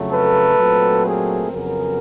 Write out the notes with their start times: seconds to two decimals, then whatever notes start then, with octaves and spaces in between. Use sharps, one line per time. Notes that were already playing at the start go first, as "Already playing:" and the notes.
Already playing: F2 C#3 F#3 A3
0.11 A4 B4
0.59 A#2 F#3 A3 C4
1.06 G#4 A#4
1.52 F2 C#3 F#3 B3 G#4 A#4